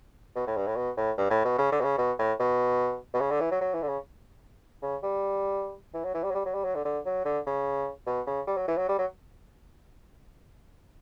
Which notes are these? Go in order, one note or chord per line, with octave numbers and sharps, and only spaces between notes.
B2
A2
G2
A2
B2
A2
G2
A2
B2
C#3
D3
B2
C#3
B2
A2
B2
B2
C#3
D3
E3
F#3
F#3
E3
D3
C#3
C#3
G3
E3
F#3
E3
G3
F#3
G3
F#3
G3
F#3
D3
D3
F#3
D3
C#3
B2
C#3
G3
F#3
E3
F#3
G3
F#3